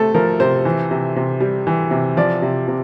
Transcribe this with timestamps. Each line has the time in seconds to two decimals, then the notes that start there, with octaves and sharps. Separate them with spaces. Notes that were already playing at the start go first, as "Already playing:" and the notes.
Already playing: C3 A3 C4 A4
0.14 F3 A#4
0.40 C3 C5
0.65 E3
0.91 C3
1.16 C3
1.40 G3
1.67 E3
1.91 C3
2.17 F3 D5
2.42 C3
2.68 C3